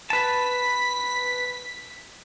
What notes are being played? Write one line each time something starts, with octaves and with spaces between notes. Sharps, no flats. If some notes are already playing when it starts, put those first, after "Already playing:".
B4 A5 B6